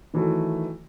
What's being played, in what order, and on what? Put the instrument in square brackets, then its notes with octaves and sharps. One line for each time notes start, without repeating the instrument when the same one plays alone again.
[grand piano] D#3 E3 F#3 A3